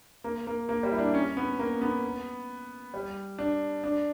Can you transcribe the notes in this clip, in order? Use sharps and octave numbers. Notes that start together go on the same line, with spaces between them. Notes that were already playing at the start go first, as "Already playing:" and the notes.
A#3
A#3
A#3
G3
E4
D4
C#4
B3
A#3
B3
G3
D4
D4